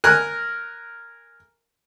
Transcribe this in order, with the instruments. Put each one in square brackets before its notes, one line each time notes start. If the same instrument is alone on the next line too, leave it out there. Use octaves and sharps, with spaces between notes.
[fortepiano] A#4 G#5 F#6